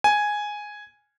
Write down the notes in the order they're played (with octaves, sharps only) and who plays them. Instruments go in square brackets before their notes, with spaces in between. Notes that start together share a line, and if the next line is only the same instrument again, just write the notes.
[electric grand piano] G#5